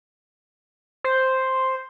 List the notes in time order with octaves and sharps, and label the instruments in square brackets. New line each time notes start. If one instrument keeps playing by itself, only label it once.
[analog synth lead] C5